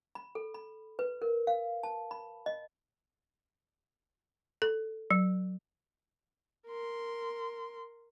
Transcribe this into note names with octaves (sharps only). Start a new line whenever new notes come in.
B5
A4
B5
B4
A#4
F5
A5
B5
D#5
A4
F#3
A#4 C6